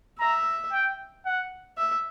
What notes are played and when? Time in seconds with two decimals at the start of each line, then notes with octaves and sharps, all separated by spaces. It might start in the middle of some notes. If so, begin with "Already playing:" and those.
0.19 E5 A#5
0.72 G5
1.26 F#5
1.78 E5